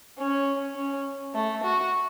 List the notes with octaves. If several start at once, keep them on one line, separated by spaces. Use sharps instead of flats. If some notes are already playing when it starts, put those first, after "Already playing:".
C#4
C#4
A3
F#4